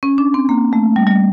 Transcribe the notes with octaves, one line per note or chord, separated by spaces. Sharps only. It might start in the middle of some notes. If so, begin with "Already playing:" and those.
C#4
D4
C4
A#3
A3
G3
G3